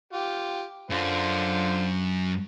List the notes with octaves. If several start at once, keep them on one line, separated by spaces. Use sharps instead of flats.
F4 G4
F#2 D3 F4 C5